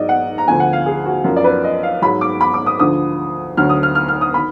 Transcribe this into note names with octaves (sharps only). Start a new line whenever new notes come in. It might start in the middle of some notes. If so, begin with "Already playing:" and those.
Already playing: G#2 F#3 D5 D#5
F#5
A#5
D2 D3 F3 G#5
F#5
F5
G#4
F#4
F#2 F3 A#4
D5
B4
D#5
F5
G#2 F#3 B5
D6
B5
D6
D#6
D2 D3 F3 D#6
D2 D3 F#3 F6
D#6
F6
F6
F6
D#6
D#3 B5